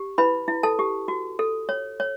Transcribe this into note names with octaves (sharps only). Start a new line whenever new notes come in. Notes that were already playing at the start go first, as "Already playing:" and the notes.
Already playing: G4
E4 B4 B5
E4
A4 A5
G4
F#4
A4
C#5
C#5